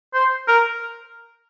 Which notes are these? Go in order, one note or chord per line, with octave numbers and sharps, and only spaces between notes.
C5
A#4